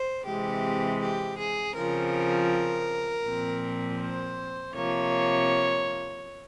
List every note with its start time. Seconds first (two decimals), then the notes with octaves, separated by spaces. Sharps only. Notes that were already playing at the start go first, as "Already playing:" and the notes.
Already playing: C5
0.25 C3 E3 G#3 C4 G4
1.00 G4
1.38 G#4
1.75 C#3 F3 C4 A#4
3.24 A#2 F3 C4
3.99 C5
4.74 C3 F3 A#3 C#5